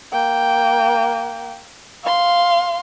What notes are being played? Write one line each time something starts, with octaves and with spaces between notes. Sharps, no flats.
A#3 G5
F5 C6